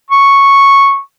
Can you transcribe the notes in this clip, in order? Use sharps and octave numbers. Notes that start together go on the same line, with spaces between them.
C#6